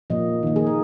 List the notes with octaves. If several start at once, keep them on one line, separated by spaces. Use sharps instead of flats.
A#2 F3 A#3 D#5
D#3 A#3
G#4
A#4